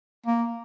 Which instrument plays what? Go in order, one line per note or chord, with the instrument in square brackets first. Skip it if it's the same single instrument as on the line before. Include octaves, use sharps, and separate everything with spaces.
[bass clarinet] A#3